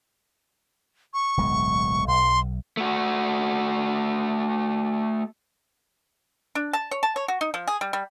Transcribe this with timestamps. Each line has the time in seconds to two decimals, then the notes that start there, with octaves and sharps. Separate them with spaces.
1.14 C#6
1.37 D1 B1 G#3
2.08 B1 C6
2.77 A3 F#4
6.55 D4
6.73 A5
6.91 C#5
7.03 A5
7.16 C#5
7.28 F#4
7.41 D#4
7.54 F3
7.68 G#4
7.81 G3
7.93 G3